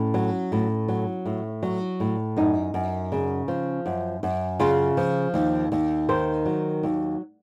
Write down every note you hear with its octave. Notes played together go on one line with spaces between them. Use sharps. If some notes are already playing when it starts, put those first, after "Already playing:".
Already playing: A2 C#4
F#3
A2
F#3
A2
F#3
A2
F#2 D#4
F#2
C#3
F3
F#2
F#2
C#3 F4
F3
D#2
D#2
D#3 C5
F#3
D#2